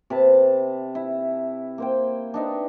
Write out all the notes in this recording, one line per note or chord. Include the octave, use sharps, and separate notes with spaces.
C3 B4 A5
E4
A#3 C5 G5
D4 D#4 B4